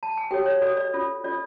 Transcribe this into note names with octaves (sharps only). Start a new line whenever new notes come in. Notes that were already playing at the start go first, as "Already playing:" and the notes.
A5
G#5
F#4 G4 A4 C#5 G5
C#5
F#4 A4 C#5 D5
D5
C#4 F4 A4
C#4 F4 A4 D5